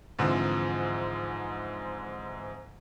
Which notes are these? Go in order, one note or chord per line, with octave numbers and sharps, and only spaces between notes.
G#2 D3 E3 F3 C4